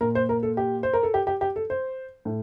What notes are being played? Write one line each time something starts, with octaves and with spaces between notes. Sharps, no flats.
A#2 A#4
C5
A#4
A4
G4
C5
A#4
A4
G4
G4
G4
A4
C5
A2